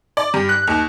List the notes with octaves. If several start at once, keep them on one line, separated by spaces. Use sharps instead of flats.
D5
G2
F#6
D#2